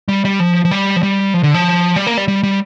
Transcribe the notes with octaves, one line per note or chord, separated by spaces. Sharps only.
G3
G3
F3
F3
G3
F3
G3
F3
D3
F3
G3
A#3
G3
G3
G3